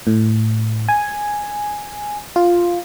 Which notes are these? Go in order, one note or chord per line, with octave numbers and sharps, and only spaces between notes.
A2
G#5
F4